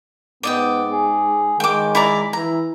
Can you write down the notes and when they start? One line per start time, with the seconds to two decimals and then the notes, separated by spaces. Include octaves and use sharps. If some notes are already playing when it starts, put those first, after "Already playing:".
0.43 G#2 B3 D5 D#5 G5
0.93 G#4
1.60 D#3 G#3 G5 D6
1.95 E4 D5 A#5
2.33 E3 E4 A#5